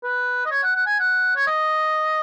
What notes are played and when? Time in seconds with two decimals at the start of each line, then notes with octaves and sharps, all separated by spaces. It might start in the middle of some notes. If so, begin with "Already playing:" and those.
0.04 B4
0.45 D#5
0.51 C#5
0.63 F#5
0.75 F#5
0.87 G#5
0.99 F#5
1.36 C#5
1.47 D#5